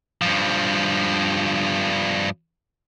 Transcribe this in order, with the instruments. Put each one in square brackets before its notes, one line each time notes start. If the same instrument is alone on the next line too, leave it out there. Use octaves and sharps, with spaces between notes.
[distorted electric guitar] G2 F3